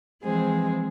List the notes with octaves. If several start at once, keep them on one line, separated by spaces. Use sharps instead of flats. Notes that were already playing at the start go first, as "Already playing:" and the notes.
E3 F3 G#3 C4 G#4